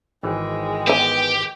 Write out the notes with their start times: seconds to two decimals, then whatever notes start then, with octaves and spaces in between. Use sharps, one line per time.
0.23 G#1 E3 G#3 G5
0.87 B3 G4 G#5